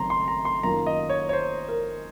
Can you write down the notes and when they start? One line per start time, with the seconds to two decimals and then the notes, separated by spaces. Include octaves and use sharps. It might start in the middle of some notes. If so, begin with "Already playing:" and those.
Already playing: F#1 D#3 F#3 C4 A#5 C6
0.10 C6
0.28 A#5
0.45 C6
0.63 F#2 D#3 A#3 F4 A#5
0.86 D#5
1.09 C#5
1.29 C#5
1.33 C5
1.69 A#4